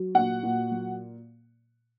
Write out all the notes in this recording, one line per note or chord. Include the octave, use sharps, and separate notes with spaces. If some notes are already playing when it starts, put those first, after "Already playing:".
Already playing: F#3
A#2 F#4 F#5
A#2
F#3